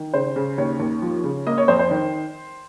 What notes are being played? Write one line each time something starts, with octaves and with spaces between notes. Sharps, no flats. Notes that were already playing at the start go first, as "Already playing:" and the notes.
Already playing: D#3
C#3 C5
C#3
D#2 C#5
D#2
F3
C#3
A#3 D#5
C#5
F2 C5
C5
D#3